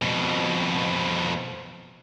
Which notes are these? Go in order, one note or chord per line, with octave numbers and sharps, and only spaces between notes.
F2 B2